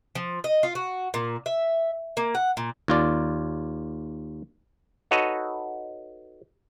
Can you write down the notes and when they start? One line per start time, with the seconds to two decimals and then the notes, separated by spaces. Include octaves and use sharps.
0.15 F3
0.44 D#5
0.63 F4
0.75 F#4
1.14 A#2
1.46 E5
2.17 A#3
2.35 F#5
2.57 A#2
2.88 D#2 F4 D5
5.11 D#4 F#4 A4 B4 C#5 D#5